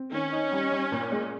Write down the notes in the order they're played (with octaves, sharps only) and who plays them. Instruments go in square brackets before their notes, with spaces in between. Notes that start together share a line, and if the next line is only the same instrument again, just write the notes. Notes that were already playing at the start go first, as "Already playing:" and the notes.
Already playing: [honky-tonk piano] C4
[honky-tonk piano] D#3 [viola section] C#4
[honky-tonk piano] D#4
G3
G3
A#2
G#3